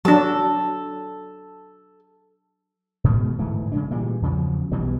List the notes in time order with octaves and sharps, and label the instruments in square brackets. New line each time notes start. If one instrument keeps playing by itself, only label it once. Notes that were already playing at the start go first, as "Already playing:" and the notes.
[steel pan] F#3 D4 [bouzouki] A4
[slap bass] G#2 B2 D#3 G#3
D1 G#2 E3 A3
C#3 G#3 D4
A#2 E3 G3 G#3
E2 C#3 F3 F#3
B1 B2 E3 G3